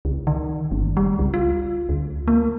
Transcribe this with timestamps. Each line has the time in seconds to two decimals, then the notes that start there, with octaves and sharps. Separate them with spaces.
0.05 C#2
0.27 D#3
0.71 G1
0.97 G3
1.19 C#2
1.34 F4
1.89 D2
2.28 A#3